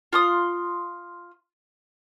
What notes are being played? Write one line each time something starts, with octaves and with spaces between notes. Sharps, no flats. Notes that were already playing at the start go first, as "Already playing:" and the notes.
F4 C6 D#6